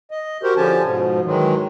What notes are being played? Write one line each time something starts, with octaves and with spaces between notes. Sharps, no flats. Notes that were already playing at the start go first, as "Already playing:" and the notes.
D#5
F#4 G4 A#4 C5
D3 F3 C#4 G4 G#5 A5
G#2 B2 F3
D#3 E3 F#3 G#3